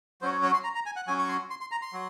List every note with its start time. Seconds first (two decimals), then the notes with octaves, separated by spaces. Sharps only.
0.22 F#3 C#4 F#4 C5
0.32 C#5
0.43 C#5
0.54 C6
0.64 A#5
0.75 A#5
0.86 G#5
0.96 F#5
1.07 F#3 C#4 F#4 G#5
1.19 C#6
1.28 C6
1.50 C6
1.61 C6
1.71 A#5
1.82 C6
1.93 F#3